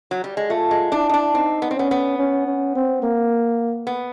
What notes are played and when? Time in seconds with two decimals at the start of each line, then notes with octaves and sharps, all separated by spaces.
0.11 F#3
0.24 G3
0.37 G#3
0.49 A3 F4
0.71 G#3
0.92 D4 E4
1.09 D#4
1.14 D4
1.35 C4 D#4
1.62 B3
1.71 C4
1.76 B3 C#4
1.91 B3
2.18 C#4
2.47 C#4
2.75 C4
3.02 A#3
3.87 B3